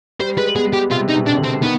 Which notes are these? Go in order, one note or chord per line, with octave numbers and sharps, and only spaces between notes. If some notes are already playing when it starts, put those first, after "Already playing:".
G3 C5
G#3 B4
B3 G#4
G3 G4
C3 F4
D#4
B2
D4
C3
D3
C4
D#3 B3